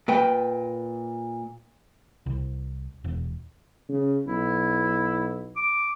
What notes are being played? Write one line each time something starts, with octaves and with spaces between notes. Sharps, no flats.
A#2 B4 G5
C2
E1
C#3
B1 E4
D6